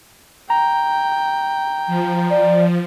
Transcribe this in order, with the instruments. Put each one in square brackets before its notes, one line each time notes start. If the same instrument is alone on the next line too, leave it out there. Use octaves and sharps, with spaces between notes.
[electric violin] G5 [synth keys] A#5
[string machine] F3
[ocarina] D5